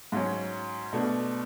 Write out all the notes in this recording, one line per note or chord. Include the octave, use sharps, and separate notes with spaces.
G#2 F#3 C#4
B2 A3 D4